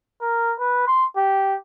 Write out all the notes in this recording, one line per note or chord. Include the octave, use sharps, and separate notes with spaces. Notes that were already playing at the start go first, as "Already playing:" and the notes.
A#4
B4
C6
G4